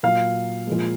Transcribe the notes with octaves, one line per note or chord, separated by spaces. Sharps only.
A#2 F#3 F5
A#2 F3 G#3